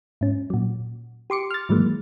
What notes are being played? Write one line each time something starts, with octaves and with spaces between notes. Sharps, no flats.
G#2 C#4
A#2 F#3
G4 C6 D6 C#7
F6 A6
G#2 D#3 E3 F#3 G#3 A#3